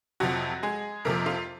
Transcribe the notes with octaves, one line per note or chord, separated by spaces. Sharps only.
F2 C3 F3 F#3 F#4
G#3 G#4
F2 C3 F3 A#3 A#4
F4